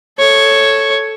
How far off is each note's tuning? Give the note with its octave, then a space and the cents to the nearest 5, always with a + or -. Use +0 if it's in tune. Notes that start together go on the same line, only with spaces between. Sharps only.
A4 +0 C#5 +0